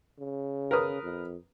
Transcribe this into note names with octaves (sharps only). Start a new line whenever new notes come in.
C#3
A#4 B4 D#6
F2